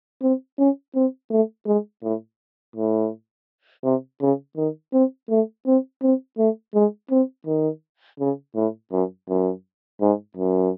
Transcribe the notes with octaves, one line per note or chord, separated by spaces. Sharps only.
C4
C#4
C4
A3
G#3
A2
A2
C3
C#3
D#3
C4
A3
C4
C4
A3
G#3
C4
D#3
C#3
A2
F#2
F#2
G#2
F#2